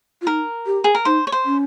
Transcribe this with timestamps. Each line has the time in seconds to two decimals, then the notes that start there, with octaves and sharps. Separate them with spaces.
0.22 F4
0.27 D#4 A#4
0.66 G4
0.84 G#4
0.95 A#4
1.05 D#4 C5
1.27 C#5
1.32 C5
1.45 C#4